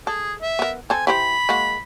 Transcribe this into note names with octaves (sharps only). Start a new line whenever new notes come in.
G#4 A4
E5
B3 A#4
C4 A4 G#5
E3 G4 C5 B5
G#3 A#3 F#4